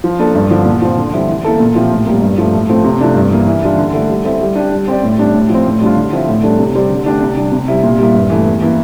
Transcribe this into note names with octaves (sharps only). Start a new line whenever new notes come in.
F3
A#3 D4 A4
G2
D3 F3 C4
A#2
F3 C4
D3
G3 C4 E4
E3
A#3 E4 A4
A#2
F3 C4 E4 G4
A2
G3 A#3
G2
F3 A3
A2
F3 A3 C4
C3
F3 A3 D4
G2
E3 A#3
E3
G3 D4 F4
D3
A3 E4 A4
G3
C4 E4 A4
G3
D4 G4
G3
C4 G4 D5
A2
G3 D4 G4
A2
F3 C4
A2
G3 D4 F4
D3
F3 C4 E4
A2
G3 D4 A4
C3
G3 C4 G4 D5
D3
A3 D4 G4 D5
C3
G3 D4
C3
G3 C4 E4
A#2
G3 A#3 E4
G2
E3 A3
E2
E3 A#3